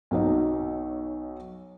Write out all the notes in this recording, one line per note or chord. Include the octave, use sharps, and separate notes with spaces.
B1 F#3 D#4